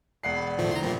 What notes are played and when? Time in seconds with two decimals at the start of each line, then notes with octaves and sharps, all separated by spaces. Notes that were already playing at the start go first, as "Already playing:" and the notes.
0.23 E1 D5 F#5 C7
0.36 B5
0.59 A2 D#3 F3 A3 F4
0.71 D3 E4 A#5 C6
0.83 A#2 F3 G3 A#3 G4